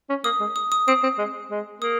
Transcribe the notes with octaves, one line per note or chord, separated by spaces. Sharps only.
C#4
A#3 D#6
G#3
D#6
D#6
C4 D#6
C4
G#3
G#3
A#3 D#6